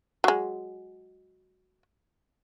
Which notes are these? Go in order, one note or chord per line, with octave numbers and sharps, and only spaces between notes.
F#3 G#3